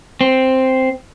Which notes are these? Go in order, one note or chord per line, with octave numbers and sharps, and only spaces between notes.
C4